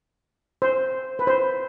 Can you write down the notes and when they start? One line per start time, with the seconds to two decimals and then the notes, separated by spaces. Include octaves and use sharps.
0.62 C5
1.19 B4
1.27 C5